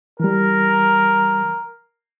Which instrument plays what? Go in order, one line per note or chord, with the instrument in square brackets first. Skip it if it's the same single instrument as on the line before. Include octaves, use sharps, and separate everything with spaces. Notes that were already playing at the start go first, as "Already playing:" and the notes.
[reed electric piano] E3 G3 [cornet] A#4